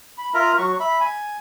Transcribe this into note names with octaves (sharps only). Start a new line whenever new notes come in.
B5
F4 A#4 E5 A#5
F#3 F#4 C#6
E5 B5
G#5